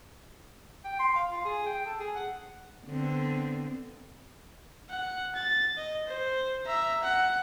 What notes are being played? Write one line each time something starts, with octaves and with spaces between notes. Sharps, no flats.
G5
C6
F5
F4
G#4
G5
A4
G#4
F#5
D3 B3 C4
F#5
A6
D#5
C5
E5 A#5
F#5